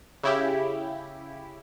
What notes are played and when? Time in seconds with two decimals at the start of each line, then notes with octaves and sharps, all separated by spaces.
0.23 C#3 E4 G4